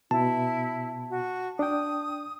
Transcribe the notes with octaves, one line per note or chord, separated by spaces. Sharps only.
B2 E4 A5
F#4
D4 G5 D#6